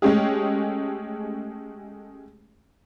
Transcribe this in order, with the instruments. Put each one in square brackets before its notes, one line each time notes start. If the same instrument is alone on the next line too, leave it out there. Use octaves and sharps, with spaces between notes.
[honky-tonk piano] G#3 A3 C#4 G4 G#4